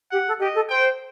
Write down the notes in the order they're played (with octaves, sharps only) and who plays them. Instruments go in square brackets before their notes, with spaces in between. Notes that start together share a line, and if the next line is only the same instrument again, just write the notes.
[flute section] G4 [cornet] F#5
[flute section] A4
[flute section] G4 [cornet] D#5
[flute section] A4
[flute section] C5 [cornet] G5